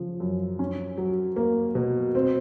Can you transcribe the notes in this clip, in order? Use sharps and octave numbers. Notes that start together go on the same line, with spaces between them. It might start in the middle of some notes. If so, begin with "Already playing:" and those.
Already playing: C#3 F3
F#2
C#4
F#3
A#3
B2
C4